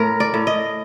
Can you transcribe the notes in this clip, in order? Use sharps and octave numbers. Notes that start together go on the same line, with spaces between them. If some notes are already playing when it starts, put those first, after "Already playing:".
Already playing: A2 A#4
D5
A2
D#5